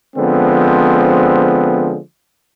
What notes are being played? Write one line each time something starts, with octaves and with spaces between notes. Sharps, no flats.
D3 F3 G#3 B3 C4